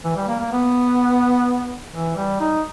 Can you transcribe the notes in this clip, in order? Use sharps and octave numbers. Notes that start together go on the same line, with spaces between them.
E3
G3
A#3
A#3
B3
E3
G3
D#4